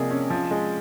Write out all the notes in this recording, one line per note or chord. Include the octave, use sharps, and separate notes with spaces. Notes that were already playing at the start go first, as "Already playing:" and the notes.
Already playing: C3 F3 A#3 G#4 D5 D#5
C#4
F3
G#3